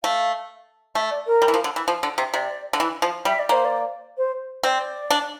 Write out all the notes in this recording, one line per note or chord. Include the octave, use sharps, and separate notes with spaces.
A3 F5
A3 E5
D5
A#4
G3
E3
F3
D3
E3
F3
D3
C3
C3 D5
D3
E3
F3
G3 E5
D5
A#3 C5
D5
C5
C4 D5
D4